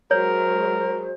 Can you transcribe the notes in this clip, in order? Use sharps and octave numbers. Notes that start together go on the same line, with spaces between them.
F#3 G#3 A#4 C5 C#5